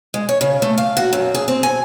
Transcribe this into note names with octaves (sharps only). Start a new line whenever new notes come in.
G#3
C#5
C#3
A3
F5
F#4
F#2
G#4
C4
G#5